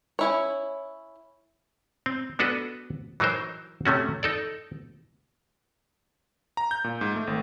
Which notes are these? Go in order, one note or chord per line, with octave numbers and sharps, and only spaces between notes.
C#4 E4 C#5
C4
B3 D4 F#4 A4 B4
E3 F#3 D#4 A#4 C5
C3 A3 C#4 F#4
D#4 A4 D5
A#5
G6
A#2
G#2
A3
G#1